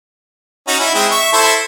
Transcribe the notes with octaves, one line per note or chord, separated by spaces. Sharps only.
C#4 D#4 F#4
E4
G#3 C4 E4
E5 C#6
E4 A4 C5